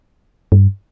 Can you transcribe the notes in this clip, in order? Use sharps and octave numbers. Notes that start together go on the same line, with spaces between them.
G2